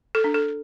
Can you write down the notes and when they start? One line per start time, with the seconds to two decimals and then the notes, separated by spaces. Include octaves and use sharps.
0.15 A4
0.24 D4
0.34 A4